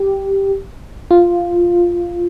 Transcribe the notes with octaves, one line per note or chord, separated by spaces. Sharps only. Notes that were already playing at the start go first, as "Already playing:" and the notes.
Already playing: G4
F4